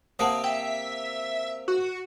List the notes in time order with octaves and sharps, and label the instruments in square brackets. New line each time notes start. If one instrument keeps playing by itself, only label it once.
[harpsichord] C3 A#3 [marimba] F#5 A5 D#6
[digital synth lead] E5 [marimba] G5
[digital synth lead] F#4